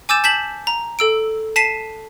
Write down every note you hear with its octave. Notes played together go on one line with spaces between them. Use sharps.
G#5 D6 E6 G6 A6 E7
A5 G6 B6 E7 F#7
A#5
A4 E6 D7
A5 B6 C7 D#7 E7